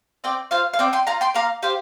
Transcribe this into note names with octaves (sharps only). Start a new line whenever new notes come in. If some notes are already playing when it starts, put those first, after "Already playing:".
C4 D5 G5
F4 C5 F5
F5
C4 D5 G5
G5 C6
F4 F5 A#5
G5 C6
A#3 F5 A#5
G4 C5 F5